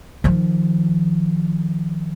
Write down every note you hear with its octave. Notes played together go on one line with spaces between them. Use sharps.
D#3 F3